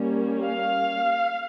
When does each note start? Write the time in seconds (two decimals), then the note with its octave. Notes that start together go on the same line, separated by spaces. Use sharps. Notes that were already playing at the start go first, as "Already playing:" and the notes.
Already playing: G3 A#3 C#4
0.46 F5